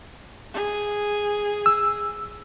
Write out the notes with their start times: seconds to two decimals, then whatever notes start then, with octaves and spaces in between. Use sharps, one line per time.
0.54 G#4
1.66 E6